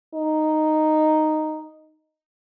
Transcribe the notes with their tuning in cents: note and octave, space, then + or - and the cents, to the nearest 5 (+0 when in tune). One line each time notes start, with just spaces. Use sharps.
D#4 -5